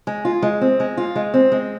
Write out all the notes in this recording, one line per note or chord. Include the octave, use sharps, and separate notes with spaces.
G#3
F4
G#3
C4
G#3
F4
G#3
C4
G#3